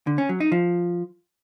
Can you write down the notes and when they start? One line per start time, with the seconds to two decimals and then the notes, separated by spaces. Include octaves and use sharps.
0.07 D3
0.18 C#4
0.29 F#3
0.40 D#4
0.52 F3